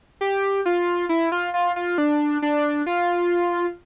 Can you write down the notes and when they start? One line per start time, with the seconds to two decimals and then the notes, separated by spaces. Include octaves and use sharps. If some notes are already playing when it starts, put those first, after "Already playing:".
0.21 G4
0.66 F4
1.09 E4
1.32 F4
1.54 F4
1.76 F4
1.98 D4
2.42 D4
2.86 F4